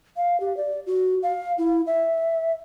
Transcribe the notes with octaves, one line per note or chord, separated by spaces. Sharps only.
F5
G4
D5
F#4
F5
E4
E5